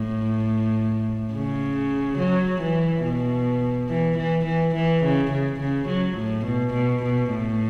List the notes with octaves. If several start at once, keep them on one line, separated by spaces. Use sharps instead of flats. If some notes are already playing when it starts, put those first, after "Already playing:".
Already playing: A2
C#3
F#3
E3
B2
E3
E3
E3
E3
C#3
C#3
C#3
F#3
A2
B2
B2
B2
A2